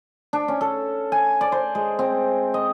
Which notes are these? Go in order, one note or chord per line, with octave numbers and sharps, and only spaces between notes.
D4
C#4
A4
G#5
D5
C5
G#3
C4
D#5